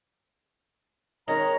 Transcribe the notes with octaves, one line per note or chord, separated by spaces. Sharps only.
D#3 G#3 C#4 A#5